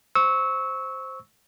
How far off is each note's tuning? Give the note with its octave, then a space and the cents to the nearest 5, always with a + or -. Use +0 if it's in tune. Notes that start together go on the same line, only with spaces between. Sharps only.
C5 +0 C#6 +0 E6 -20